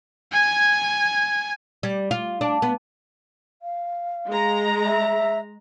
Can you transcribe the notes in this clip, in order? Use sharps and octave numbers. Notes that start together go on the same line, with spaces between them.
G#5 G#6
G3
F4
D4
B3
F5
G#3 A#5
E5